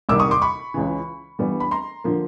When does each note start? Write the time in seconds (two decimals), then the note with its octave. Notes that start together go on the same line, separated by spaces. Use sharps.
0.09 C2 C3 D#3 G3 A#3 D6 E6
0.20 C#6 D#6
0.31 C6 D6
0.42 B5 C#6
0.74 C#2 C#3 E3
1.39 G2 E3 G3 B3
1.60 B5
1.71 A#5 C6
2.04 D3 F3 A#3